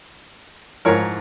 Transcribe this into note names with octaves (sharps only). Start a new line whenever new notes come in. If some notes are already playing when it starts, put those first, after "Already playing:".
G#2 F3 A#4 C#5